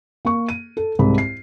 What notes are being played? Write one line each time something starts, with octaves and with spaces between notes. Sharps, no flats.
A#3 C#6
D#7
A4
C2 G#2 B5
C7